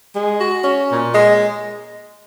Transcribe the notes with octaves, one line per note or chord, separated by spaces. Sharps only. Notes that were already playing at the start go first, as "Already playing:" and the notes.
G#3
F#4
C#4
A#2
G#3